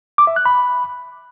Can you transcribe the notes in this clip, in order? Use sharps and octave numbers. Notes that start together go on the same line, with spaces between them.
D6
E5
F#6
B5